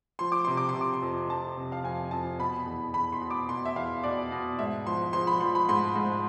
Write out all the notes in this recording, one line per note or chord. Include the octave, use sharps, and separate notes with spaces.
F3 C6
D6
C3 C6
D6
C6
C3
D6
C6
F2
F2 A5
C3
F5
F2 G#5
F2 A5
B2 B5
E2
E2 B5
C6
B2
D6
B2 C6
E5
E2 F5
B2 D5
B2
G#2 E5
F3 C6
F3 C6
B5
F3 C6
B5
G#2 C6
G#2